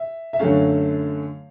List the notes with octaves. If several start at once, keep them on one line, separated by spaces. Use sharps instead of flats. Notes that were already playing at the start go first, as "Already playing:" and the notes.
Already playing: E5
E5
F#2 D3 F#3 A3 C#4 F5